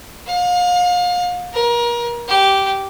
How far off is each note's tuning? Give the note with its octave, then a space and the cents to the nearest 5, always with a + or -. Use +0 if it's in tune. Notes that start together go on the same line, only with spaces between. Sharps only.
F5 +35
A#4 +35
G4 -10